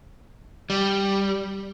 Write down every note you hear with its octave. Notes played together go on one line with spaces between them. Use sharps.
G3